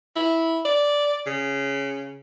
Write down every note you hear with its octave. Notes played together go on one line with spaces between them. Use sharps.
E4
D5
C#3